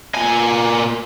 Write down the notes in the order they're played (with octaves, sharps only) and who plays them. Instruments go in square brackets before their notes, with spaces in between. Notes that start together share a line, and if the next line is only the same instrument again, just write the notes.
[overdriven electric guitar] A#2 G#5